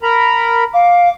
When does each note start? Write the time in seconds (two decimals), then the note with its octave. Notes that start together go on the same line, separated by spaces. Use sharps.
0.03 A#4 A#5 B5
0.74 F5 D6